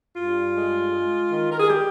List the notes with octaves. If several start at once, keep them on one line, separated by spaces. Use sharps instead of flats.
G2 F4
G#3
G#3
D#3
A#4
G#4
G4